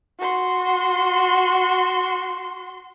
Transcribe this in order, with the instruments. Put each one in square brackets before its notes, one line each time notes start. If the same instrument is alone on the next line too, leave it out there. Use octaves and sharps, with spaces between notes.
[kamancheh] F#4 C6